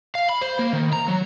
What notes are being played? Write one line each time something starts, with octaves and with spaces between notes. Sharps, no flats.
F5
B5
C5
A#3
D#3
A#5
F#3